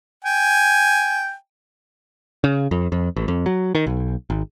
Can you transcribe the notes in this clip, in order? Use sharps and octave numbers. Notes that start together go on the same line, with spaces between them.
G5 G#5
C#3
F2
F2
A1
F2
F#3
D#3
B1
G#1